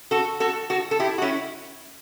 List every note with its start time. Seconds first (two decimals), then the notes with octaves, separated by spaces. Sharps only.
0.11 F#4 A4
0.40 F#4 A4
0.70 F#4 A4
0.91 A4
1.00 E4 G4
1.18 F#4
1.22 C#4 E4